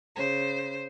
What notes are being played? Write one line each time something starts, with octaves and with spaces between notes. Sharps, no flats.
C#3 C5